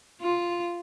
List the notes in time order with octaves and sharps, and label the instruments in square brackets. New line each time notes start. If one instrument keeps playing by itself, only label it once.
[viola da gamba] F4